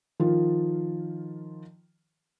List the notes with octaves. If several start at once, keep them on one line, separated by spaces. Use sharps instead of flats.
D#3 F3 F4